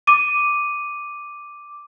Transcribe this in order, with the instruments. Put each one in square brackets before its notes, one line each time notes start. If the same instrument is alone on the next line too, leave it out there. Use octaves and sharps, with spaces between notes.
[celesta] D6 D#7